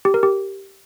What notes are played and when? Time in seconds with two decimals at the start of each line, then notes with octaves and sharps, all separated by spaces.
0.05 G4
0.14 A#4
0.23 G4